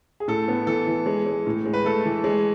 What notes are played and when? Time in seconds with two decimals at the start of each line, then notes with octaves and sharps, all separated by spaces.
0.20 G#4
0.28 A2 A4
0.48 B3
0.67 E3 A4
0.87 E3
1.06 G#3
1.26 G#3
1.46 A2
1.65 G#3
1.73 B4
1.85 A3 A4
2.05 E3
2.24 G#3